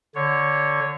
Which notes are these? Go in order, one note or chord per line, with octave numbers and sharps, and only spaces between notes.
D3 C#5